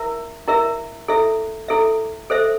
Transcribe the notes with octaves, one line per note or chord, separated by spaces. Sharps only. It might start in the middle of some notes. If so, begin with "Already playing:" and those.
Already playing: E4 A#4 E5
E4 A#4 E5
E4 A4 E5
E4 A4 E5
A4 C5 E5